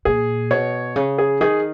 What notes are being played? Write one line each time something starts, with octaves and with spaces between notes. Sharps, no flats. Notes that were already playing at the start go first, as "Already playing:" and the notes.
A#2 G#4
B2 C#5
C#3
G#4
D#3 G#4